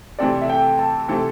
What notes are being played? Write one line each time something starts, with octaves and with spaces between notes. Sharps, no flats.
C3 E3 A3 C4 A4 D5
E5
G5
A5
C3 E3 A3 C4 A4